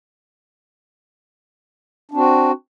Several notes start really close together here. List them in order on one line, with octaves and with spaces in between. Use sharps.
D4 C4 F#4